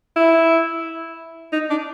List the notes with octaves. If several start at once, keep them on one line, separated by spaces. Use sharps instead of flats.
E4
D#4
D4